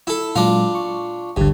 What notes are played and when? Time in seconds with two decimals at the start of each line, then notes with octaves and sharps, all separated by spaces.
0.07 E4 A4
0.36 A#2 F#3 G#3 D4 F4
0.75 C#6
1.36 G#1 D2 G2 D3